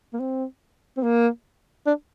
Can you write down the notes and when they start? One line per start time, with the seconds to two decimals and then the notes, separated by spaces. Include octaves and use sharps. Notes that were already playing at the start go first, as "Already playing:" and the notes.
0.13 A#3
0.20 C4
0.97 C4
1.03 A#3
1.86 D4